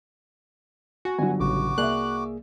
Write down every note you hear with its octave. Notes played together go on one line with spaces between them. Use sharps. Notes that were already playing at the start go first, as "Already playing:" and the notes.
F#4 G#5
G1 G2 F#3 G#5
A1 C#3 F#4 D6
C2 A#3 G#4 D5 E5 F#6